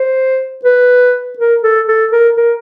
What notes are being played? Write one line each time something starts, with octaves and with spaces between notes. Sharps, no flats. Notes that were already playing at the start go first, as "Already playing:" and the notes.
Already playing: C5
B4
A#4
A4
A4
A#4
A#4